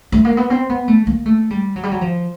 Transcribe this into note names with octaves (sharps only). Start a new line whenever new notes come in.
A3
A#3
B3
C4
B3
A3
A#3
A3
G3
F#3
G3
F#3
F3